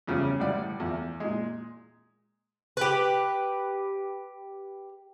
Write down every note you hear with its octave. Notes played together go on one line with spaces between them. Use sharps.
E2 C#3 F3 G3 C#4
D2 A2 G3 D5
E2 F3
A#2 G#3
G4 B4